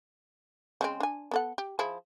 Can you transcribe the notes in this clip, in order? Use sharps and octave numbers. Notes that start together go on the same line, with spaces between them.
C#3 G#3 C4
D4 G#5
B3 A4 F#5
G4
F3 E4 G#4